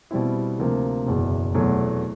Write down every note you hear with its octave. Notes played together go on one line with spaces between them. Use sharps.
B2 G3 C4 E4
D2 C3 F3 A#3
F#1 E2 B2
F1 E2 B2 F#3 A3